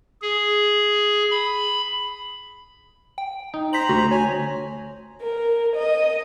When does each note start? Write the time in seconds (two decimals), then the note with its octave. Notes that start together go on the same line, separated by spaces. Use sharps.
0.22 G#4
1.31 B5
3.18 G5
3.54 D#4
3.73 C5 A#5 B6 F#7
3.89 D2 F#4
4.11 C#5 G#5
5.23 A#4
5.77 D#5